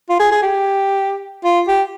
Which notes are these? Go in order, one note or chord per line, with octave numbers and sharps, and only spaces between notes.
F4
G#4
G#4
G4
F4
G4